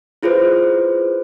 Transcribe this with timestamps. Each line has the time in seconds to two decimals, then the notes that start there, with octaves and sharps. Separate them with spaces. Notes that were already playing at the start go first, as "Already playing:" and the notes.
0.23 E4 F4 G#4 B4 C5